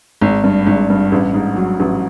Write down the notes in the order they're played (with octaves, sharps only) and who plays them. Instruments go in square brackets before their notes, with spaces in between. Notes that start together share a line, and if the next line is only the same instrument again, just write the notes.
[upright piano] G#1
G2
G#1
G2
A1
G#2
F#3
A1